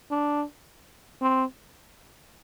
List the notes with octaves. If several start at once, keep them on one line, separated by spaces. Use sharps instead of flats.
D4
C4